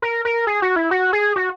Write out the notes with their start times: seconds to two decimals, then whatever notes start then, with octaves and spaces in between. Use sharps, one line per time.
0.02 A#4
0.25 A#4
0.47 G#4
0.62 F#4
0.76 E4
0.91 F#4
1.13 G#4
1.36 F#4